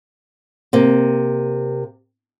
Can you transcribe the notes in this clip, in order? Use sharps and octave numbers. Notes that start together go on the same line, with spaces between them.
C3 A#3